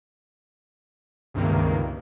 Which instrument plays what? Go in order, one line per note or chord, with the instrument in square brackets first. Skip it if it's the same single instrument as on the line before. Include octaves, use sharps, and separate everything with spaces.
[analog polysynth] C#2 G2 C3 D#3 A#3